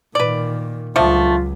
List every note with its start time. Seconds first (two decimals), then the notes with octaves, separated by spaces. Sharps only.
0.15 A#2 D#3 B4 D5
0.96 C#2 D3 F3 F#3 A3 F4